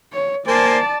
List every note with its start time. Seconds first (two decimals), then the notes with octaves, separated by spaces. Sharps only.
0.13 C#5
0.47 A#3 C5 D5 G#5 A5